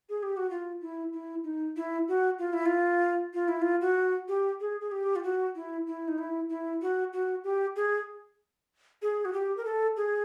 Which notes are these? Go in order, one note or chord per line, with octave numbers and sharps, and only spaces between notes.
G#4
G4
F#4
F4
E4
E4
D#4
E4
F#4
F4
E4
F4
F4
E4
F4
F#4
G4
G#4
G#4
G4
F4
F#4
E4
E4
D#4
E4
E4
F#4
F#4
G4
G#4
G#4
F#4
G4
A#4
A4
G#4